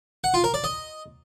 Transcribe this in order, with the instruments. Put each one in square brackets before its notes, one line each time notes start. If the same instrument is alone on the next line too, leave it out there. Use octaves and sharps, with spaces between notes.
[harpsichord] F#5
F4
A#4
D5
D#5